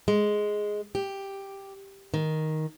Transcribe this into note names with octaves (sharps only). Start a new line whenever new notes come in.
G#3
G4
D#3